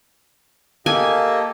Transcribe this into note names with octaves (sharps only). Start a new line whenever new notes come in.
A#3 G4 A4 D#5 G#5